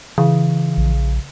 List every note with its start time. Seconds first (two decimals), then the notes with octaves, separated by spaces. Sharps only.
0.18 C#3 E3
0.77 A#1